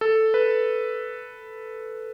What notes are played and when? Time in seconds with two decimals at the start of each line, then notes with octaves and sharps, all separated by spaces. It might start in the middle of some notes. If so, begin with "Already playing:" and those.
0.01 A4
0.34 B4